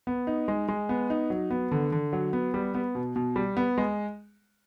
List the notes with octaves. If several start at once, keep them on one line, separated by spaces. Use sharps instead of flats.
B3
D#4
G#3
G#3
B3
D#4
F#3
B3
D3
D3
F#3
B3
G3
B3
B2
B2
G3
B3
G#3